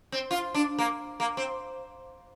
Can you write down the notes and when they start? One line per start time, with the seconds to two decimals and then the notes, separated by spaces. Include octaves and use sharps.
0.12 C4
0.31 F4
0.54 D4
0.79 A#3
1.20 A#3
1.37 C4